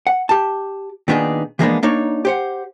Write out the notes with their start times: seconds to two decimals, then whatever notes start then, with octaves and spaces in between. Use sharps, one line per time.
0.07 F#5
0.29 G4 A5
1.08 A#2 D#3 B3 D4 D#4 G#4
1.59 E3 F3 G#3 A#3 B3 D4
1.83 A#3 D4 D#4 C#5
2.25 G4 C5 F#5